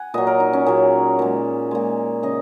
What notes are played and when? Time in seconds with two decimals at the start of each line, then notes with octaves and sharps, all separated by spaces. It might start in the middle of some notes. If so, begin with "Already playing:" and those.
Already playing: F#5 G#5
0.14 A#2 F#3 D#5
0.27 A#4
0.40 D#4
0.53 C#4
0.66 A#2 F#3 G#4
1.19 A#2 G#3
1.71 A#2 G#3
2.23 C#3 D#5